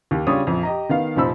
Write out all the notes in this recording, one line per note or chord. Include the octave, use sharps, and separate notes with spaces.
D#2 G4
C#3 G3 D4 F4 C#5 D#6
A#1 F2
G4 D#5 A#5
D#3 B3 F5
F1 A#2 F3 D#4 B5 E6